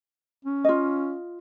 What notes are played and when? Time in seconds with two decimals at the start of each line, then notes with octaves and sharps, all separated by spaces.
0.45 C#4
0.64 F4 D#5